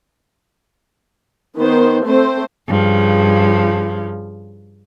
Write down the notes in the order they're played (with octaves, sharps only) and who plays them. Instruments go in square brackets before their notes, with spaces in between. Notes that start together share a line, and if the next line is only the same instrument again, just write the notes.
[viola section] D#3 B3 C5
A3 C4 C5
[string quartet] G2 C#3 F3